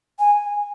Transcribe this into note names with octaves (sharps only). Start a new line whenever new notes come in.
G#5